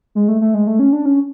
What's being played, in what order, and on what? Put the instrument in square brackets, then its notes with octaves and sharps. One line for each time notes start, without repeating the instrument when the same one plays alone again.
[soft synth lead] G#3
A3
A3
G#3
A3
C#4
D4
C#4